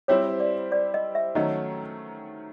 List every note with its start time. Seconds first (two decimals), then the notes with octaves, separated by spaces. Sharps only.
0.08 G3 C4 E4 G4 C#5
0.40 D5
0.72 D5
0.94 D#5
1.15 E5
1.35 D#3 F#3 A3 C#4 D#5